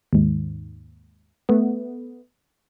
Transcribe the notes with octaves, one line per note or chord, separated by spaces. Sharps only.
D#2 G#2
A3 B3